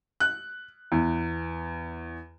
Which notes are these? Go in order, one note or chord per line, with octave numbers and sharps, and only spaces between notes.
F#6
E2